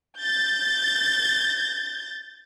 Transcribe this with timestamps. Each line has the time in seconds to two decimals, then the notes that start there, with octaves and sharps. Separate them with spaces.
0.19 G6 A6